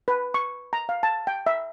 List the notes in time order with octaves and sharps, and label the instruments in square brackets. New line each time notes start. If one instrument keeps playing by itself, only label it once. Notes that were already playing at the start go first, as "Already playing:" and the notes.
[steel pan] B4
C#6
A#5
F5
A5
G5
E5